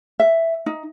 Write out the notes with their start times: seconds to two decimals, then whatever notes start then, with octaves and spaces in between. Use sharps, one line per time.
0.20 E5
0.66 D#4